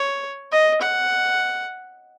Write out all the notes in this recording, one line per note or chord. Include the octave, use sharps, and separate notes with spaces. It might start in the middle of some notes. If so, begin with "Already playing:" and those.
Already playing: C#5
D#5
F#5